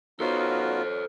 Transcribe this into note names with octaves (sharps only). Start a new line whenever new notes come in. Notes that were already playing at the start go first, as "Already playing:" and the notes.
B3 D#4 F4 F#4 A4 C5 C#5